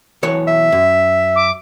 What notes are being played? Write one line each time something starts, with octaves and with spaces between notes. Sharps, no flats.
B1 E3 C#5
E5
F#2
D6